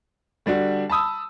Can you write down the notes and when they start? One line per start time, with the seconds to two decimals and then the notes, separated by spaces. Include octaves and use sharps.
0.46 D3 G3 D4 F#4
0.90 A5 B5 D#6 E6